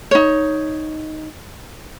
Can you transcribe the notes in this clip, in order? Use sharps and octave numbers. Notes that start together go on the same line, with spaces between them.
D#4 C#5